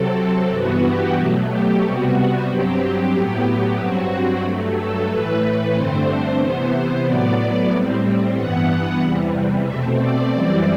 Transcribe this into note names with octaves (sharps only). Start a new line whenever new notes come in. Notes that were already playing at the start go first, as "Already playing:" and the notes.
Already playing: C3 F#3 C4 A4
G2 E3 B3 F#4
G4
B2 F#3 A3 F#4
G4
C3 G3 B3 F#4
G2 F#3 C4 G4
G4
A2 F#3 B3 G4
G2 F#3 C4 F#4
G2 F#3 A3
A4
A2 E3 A3 B4
G2 D3 A3 C4 C5
C3 E3 B3 C5
A2 F#3 B3 D5
A2 G3 C4
G2 E3 B3 F#5
E2 C3 E3 G3
B2 A3 C4 E5
D5
F#2 E3 G3 C4 D5